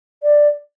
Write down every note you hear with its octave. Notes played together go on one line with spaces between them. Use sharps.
D5